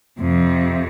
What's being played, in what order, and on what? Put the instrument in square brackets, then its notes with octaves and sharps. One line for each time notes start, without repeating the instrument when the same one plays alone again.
[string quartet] F2 C3